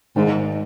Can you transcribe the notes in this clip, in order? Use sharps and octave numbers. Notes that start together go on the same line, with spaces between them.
G#1 G#2